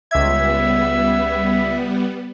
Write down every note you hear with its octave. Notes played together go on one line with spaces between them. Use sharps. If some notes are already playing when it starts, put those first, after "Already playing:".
C#2 G3 B3 E5 G#6